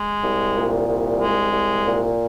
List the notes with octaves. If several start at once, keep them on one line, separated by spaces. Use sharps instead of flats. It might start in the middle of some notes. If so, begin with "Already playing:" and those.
Already playing: G#3
C2
A#2
C2
G#3
C2
A#2